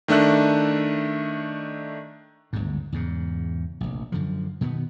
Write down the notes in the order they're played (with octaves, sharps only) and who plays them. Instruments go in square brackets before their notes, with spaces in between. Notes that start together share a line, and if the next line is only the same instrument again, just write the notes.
[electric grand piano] D#3 A3 D4 E5 F#6
[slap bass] G1 D2 G#2
E2 G#2 C#3
F1 A#1
F#2 D3 F3
B2 D#3 B3